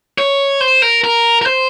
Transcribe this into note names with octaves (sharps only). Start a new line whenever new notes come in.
C#5
C5
A#4
A#4
A#4
C5